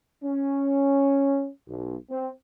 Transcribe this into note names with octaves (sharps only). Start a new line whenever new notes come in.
C#4
B1
C4